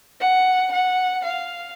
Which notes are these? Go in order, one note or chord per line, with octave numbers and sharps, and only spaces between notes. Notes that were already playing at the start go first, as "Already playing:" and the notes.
F#5
F#5
F5